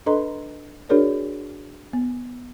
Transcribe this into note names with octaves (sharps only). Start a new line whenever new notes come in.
D4 A4 B4 D#5 A#5 C6
D4 F#4 G#4 A#4 C#5 D5
B3